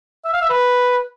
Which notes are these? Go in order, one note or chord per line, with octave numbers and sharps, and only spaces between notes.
E5
F5
E5
B4